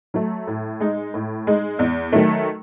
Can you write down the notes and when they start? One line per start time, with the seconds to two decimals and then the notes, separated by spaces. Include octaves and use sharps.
0.14 F#3 A3
0.47 A2
0.80 G#3 D#4
1.14 A2
1.47 G#3 D#4
1.79 E2
2.12 D#3 F#3 A3